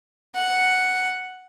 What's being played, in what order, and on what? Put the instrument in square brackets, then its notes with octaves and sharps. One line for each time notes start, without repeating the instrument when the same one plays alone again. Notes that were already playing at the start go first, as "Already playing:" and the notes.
[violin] F#5